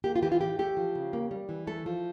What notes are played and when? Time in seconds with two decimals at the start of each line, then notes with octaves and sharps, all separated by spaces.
0.04 A#3 G4
0.16 F4
0.23 E3 G4
0.32 F4
0.41 A2 G4
0.59 A3 G4
0.77 F3
0.95 C#3
1.13 A#3
1.31 G3
1.49 E3
1.67 A3 A4
1.86 F3